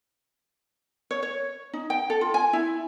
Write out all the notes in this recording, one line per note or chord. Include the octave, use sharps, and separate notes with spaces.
C#5
C#5
D#4
G5
A4
F4
G#5
E4